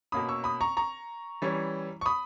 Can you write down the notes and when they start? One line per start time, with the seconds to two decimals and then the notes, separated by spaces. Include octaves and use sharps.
0.12 B2 A#3 C#4 B5 D#6
0.29 C#6 E6
0.44 B5 D#6
0.61 A#5 C#6
0.77 A#5 C#6
1.42 E3 G3 C#4
2.01 C#6
2.06 B5 D#6